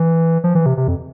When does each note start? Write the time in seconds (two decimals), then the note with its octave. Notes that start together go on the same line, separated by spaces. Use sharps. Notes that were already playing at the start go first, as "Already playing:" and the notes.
Already playing: E3
0.44 F3
0.55 E3
0.66 C3
0.77 C3
0.88 F2